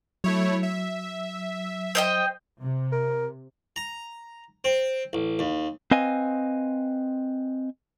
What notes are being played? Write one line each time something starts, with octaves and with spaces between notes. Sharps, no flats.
F#3 A3 E4 C#5
E5
C5 D#5 G5
C3
A#4
A#5
C4
A1
D#2
C4 B4 D#5 F5 G#5